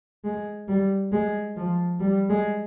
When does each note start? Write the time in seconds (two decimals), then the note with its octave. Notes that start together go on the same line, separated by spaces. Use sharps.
0.24 G#3
0.68 G3
1.12 G#3
1.57 F3
2.00 G3
2.30 G#3